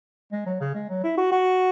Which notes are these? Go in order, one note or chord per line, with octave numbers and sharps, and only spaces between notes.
G#3
F#3
C#3
G#3
F#3
E4
F#4
F#4